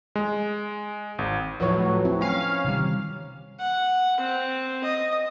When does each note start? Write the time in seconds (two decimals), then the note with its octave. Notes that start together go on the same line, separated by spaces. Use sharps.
0.16 G#3
1.19 G#1
1.60 A2 F3 F#3 B4 C#5
2.05 C4 E4
2.21 C#4 F5
2.65 C3 D#3 G3
3.59 F#5
4.20 C4
4.84 D#5